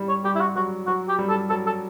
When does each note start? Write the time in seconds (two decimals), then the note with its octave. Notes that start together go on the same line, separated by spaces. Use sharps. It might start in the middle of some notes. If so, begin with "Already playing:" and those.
Already playing: G3
0.09 C#5
0.24 G3 G4
0.35 E4
0.41 F#4
0.56 F#3 F#4
0.87 F#3 F#4
1.08 G4
1.19 G3
1.29 A4
1.50 F#3 A4
1.66 A4